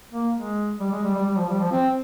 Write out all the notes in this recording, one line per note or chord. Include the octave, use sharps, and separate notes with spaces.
A#3
G#3
G3
G#3
G3
G3
G3
F3
G3
F3
C4